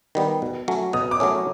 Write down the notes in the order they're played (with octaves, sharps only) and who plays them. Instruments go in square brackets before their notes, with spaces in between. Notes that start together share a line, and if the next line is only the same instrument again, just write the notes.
[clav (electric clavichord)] D#3 G3 B3
B2
F#3 A3 C#4
[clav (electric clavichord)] B2 [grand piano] D#6
[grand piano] D6
[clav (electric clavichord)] F#3 A3 C#4